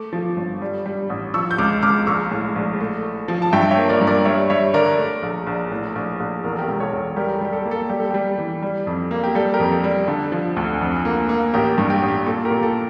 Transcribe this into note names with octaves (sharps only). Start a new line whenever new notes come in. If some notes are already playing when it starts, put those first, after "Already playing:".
Already playing: A3 D6
F3
G1
G3
G3
A1
F3 C#6 E6
G6
C#2 D6 F6
C#2 D6 F6
A#1 C#6 E6
A2
A#1
A3
A3
F3
A5
G2 E5 G5
C#5 E5
A#3
A#4 D5
G2
A#4 D5
G3 C#5 E5
G3 C#5 E5
D3 A#4 D5
A3
A#1
A#1
A2
A#1
A#1
E2 A#4
A4
G4 A#4
E1
A4 C#5
E2
G3 G4 A#4
A4
G3 G4
A4
A#3
A4
G3 G4
A4
G3 G4
E3
G3
F2
A#3
G4
G3 A4
G4 A#4
F2
A4
G3
D3 A4
F3
D2
F2
A#3
A#3
A1 G4 A#4
G2
G4
A1
G4
A#2 A4
G4 A#4
A#2
A4